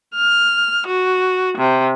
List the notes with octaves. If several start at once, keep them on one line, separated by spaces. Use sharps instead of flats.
F6
F#4
C3